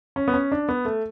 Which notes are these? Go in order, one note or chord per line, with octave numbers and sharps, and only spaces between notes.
C#4
B3
C#4
D4
B3
A3